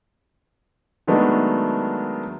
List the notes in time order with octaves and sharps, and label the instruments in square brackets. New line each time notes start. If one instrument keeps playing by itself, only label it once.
[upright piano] D#3 F#3 G#3 A3 B3 D4